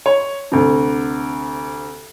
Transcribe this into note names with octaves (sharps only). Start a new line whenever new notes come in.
C#5
D2 C3